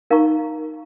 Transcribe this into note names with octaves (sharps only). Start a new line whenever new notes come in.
D#4 A#4 F5 A#5 C#6